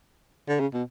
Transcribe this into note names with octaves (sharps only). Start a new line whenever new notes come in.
D3
C#3
B2